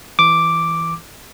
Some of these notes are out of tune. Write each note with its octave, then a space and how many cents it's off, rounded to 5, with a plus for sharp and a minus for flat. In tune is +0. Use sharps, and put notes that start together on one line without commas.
E3 +0 D6 +0